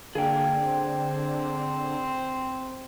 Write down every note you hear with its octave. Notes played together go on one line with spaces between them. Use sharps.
D3 A#3 G#4 G5
C4